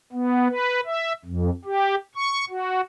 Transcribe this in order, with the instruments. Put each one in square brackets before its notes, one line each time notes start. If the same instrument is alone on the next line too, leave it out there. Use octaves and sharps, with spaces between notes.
[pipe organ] B3
B4
E5
F2
G4
C#6
F#4